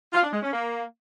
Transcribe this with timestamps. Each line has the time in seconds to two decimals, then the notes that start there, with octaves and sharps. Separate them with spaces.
0.13 F4
0.23 D4
0.33 G#3
0.42 C#4
0.52 A#3